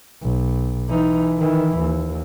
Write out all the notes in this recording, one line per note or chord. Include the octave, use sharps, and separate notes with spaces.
B1
E3 D#4
D#3 E3
D#2